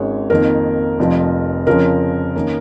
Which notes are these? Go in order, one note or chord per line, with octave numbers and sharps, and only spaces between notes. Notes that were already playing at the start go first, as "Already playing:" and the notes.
Already playing: G#1 G#2 G#3 C#4 C#5
F2 D#3 A#3 A#4
F1 F2 F3
F2 C#3 F3 C#4 A#4
D#3 A#3 C#4